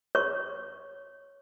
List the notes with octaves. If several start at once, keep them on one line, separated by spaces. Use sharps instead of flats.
C#5 C#6